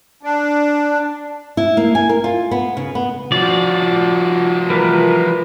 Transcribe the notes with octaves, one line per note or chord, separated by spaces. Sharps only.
D4
E4
A#3
G#5
A#4
F4
B3
C#3
B3
F3 F#4 D5
E3 G3 A#4 B4